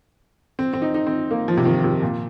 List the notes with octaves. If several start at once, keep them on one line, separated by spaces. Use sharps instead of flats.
C4
C4
D#4
D#4
C4
A#3
F3
C3
D#3
C3
A#2